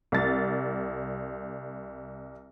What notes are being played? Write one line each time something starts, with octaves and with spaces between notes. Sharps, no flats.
C2 A6